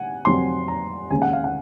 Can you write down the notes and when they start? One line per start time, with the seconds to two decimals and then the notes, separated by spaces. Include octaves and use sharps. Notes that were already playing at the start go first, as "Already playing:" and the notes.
Already playing: C3 F#5 G#5
0.25 F2 C3 F#3 C4 C6
0.68 A#5
1.10 D#2 C#3 G#3 C#4 G#5
1.22 F#5
1.33 F5
1.44 F#5